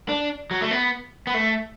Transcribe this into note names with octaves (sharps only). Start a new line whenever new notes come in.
D4
F#3
A3
B3
B3
A3